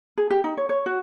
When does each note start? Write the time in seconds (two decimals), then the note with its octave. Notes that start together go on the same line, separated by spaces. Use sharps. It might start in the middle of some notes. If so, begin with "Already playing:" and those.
0.18 G#4
0.30 G4
0.44 D#4
0.57 C#5
0.69 C#5
0.86 F#4